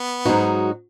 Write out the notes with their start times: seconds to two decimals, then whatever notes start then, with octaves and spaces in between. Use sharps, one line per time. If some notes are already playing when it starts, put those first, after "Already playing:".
Already playing: B3
0.25 G#2 F#3 D#4 F#4